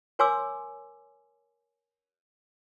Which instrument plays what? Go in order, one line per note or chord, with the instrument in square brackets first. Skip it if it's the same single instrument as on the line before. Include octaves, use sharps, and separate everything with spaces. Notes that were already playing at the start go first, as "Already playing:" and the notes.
[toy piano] A#4 C#5 G#5 C6 D6 E6